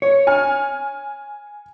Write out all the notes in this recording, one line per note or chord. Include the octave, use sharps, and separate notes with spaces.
C#5
G#5 F6